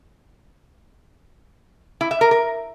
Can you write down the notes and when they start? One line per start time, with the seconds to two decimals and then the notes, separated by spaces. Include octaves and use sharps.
2.01 E4
2.11 E5
2.21 A#4
2.31 A#4